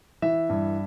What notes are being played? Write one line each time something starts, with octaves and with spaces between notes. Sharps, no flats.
E3 E5
G2